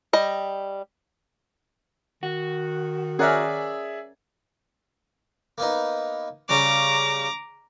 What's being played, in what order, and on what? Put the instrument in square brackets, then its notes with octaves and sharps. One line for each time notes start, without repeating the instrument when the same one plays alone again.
[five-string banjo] G3 D#5
[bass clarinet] D#3 [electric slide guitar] F#4
[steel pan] C#4 A#4 F#5 [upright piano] G#4 D5 E5
[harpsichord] A#3 B3 D#4
[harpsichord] C#3 G3 C#4 [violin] A#5 D6